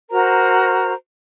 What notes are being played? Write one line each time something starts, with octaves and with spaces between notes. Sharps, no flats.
F#4 A#4 C5 A#5